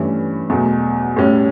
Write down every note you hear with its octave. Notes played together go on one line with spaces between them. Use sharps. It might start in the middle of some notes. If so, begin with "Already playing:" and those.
Already playing: G2 E3 A3 C#4
E2 B2 F#3 A3
A2 G3 C#4